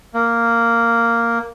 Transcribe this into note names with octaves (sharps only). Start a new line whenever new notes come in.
A#3